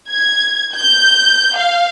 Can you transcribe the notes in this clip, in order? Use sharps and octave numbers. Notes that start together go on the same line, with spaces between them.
G#6
G6
F5